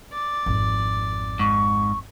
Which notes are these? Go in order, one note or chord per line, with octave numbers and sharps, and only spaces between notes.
D5
G#1 F2
G#2 C#6